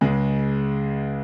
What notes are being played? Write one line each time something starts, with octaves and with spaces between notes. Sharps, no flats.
C#2 C#3 G#3